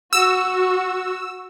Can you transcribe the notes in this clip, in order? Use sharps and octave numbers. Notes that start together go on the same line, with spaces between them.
F#4 E6